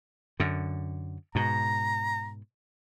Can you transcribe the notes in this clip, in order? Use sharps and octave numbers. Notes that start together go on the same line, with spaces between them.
F#2 D3
G#2 B2 A#5